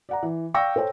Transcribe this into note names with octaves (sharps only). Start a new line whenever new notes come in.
D5 F#5 A#5
E3
D5 F5 G5 C#6 E6 A#6
A4 C5 C#5 G5